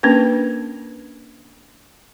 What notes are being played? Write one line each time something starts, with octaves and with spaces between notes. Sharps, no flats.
A#3 C#4 D4 A#4 B4